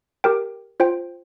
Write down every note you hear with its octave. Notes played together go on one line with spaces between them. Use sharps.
G4 A#4 G5
F4 C5 G5